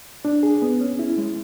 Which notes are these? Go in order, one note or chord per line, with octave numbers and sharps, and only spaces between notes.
D4
G#4
B3
C#4
E4
G#3